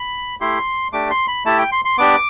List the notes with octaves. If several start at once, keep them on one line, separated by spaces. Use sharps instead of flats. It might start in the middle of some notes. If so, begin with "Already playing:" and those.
Already playing: B5
A3 E4 G4 C6
A3 D4 G4 D6
C6
B5
A3 E4 G4 A5
G5
C6
C6
B3 D4 G4 D6